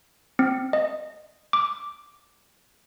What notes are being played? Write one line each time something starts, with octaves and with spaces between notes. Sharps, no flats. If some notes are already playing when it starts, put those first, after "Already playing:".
C4
D#5
D6